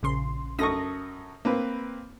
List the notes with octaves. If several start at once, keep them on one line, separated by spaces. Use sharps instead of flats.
A#1 C#3 C6
F#2 A4 C#6 D#6 A#6
A#3 C4 B4